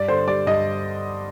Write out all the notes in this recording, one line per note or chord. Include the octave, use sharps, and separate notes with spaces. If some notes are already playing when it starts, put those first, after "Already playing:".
Already playing: G2 D5
D3 C5
G3 D5
G2 D#5